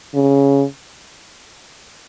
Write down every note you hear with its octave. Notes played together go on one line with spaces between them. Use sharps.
C#3